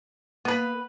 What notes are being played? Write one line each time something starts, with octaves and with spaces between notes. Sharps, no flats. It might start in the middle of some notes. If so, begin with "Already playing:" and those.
A#3 B3 B4